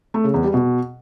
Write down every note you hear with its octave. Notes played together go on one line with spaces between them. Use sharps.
A3
C#3
E2
G3
B2